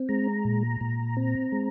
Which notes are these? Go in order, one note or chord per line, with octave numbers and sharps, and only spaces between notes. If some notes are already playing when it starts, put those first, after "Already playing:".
Already playing: C4
G#3 A#5
A#2
A#2
C4
G#3